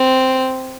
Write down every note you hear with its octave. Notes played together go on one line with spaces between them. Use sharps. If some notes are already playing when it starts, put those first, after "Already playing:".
Already playing: C4